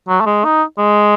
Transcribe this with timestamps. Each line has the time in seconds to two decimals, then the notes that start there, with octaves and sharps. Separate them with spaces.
0.08 F#3
0.20 A3
0.26 G#3
0.44 D#4
0.78 G#3